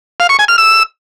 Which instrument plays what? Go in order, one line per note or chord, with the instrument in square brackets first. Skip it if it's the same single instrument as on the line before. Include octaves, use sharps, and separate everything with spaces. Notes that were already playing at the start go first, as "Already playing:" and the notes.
[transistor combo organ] F5
C#6
G#5
F6
E6